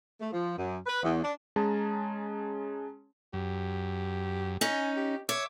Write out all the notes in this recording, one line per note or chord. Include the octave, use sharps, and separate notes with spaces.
A3
F3
F#2
B4
E2
D4
G#3 C#4 G#4 A5 A#5
F#2 G4
C#4 D#4 G#5
G4
C#5 E5 D6